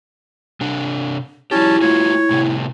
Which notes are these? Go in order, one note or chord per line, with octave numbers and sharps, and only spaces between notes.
C3 D4
F#3 C#4 E4 G4 A5
A3 F4 F#4 C#5
A2 C3